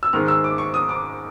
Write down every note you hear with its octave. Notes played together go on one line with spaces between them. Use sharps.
E6
G#2 D#3 G#3 F6
E6
D6
C#6
D#6
D6